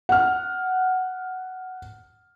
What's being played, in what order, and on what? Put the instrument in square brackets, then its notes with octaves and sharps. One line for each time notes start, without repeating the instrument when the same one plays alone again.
[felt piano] F#5 F6